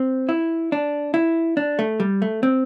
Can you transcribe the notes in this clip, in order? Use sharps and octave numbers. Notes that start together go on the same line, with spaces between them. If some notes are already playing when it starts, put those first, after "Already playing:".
Already playing: C4
E4
D4
E4
D4
A3
G3
A3
C4